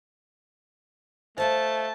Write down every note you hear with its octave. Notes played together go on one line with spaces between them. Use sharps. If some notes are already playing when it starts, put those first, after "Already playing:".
A3 C5 D#5 F5 A5